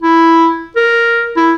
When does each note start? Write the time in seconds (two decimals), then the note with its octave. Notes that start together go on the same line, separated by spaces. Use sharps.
0.02 E4
0.76 A#4
1.37 E4